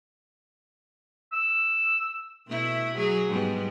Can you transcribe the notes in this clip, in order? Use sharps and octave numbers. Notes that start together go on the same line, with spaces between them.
E6
B2 A3 E4
F#3 G#4
G#2 G3 B3